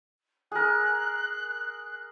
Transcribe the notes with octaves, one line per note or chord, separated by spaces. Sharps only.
G#4 A#4 F#6